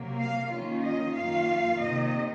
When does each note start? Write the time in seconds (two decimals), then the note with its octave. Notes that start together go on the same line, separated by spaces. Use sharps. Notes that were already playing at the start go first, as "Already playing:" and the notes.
Already playing: C3 F#3 A#3
0.18 F5
0.50 D#3 A#3 C#4 F4
0.83 D#5
1.15 F#2 D#3 A#3 F4 F5
1.80 C3 D#3 A#3 D#5